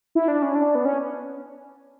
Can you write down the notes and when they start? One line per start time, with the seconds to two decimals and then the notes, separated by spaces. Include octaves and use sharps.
0.15 E4
0.28 D4
0.42 C#4
0.55 D4
0.75 B3
0.85 C#4